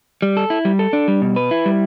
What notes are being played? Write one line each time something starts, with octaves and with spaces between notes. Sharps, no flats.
G3
A4
E4
G3
A4
D4
G3
B2
B4
E4
G3